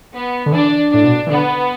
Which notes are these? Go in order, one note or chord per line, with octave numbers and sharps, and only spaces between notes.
B3
D3
E3 D4
A2 D4
B2
E3
D3 B3